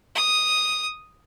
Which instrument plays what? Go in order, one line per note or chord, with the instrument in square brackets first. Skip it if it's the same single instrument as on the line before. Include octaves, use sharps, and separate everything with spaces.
[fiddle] D#6